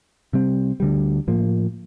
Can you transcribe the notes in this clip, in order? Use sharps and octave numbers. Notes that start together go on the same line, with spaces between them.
C3 G3 C4
D2 D3 G3
A2 F3 A#3